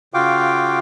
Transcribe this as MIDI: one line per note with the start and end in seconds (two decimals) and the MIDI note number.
0.14 0.79 49
0.14 0.79 65
0.14 0.79 66
0.14 0.79 77
0.14 0.79 79
0.14 0.79 86